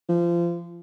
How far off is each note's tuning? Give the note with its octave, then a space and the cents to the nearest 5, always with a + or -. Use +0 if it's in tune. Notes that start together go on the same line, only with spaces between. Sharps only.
F3 -25